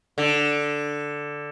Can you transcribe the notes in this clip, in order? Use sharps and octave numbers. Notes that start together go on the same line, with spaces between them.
D3